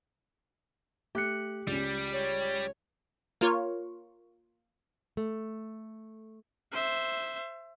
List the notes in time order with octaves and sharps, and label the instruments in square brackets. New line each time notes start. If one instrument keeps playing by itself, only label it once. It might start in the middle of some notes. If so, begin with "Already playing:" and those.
[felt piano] A3 [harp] G4 F#6 C#7
[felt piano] C#2 C#4 [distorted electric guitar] G3
[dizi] C#5
[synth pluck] A#3 F4 C#5
[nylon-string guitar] A3
[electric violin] C5 E5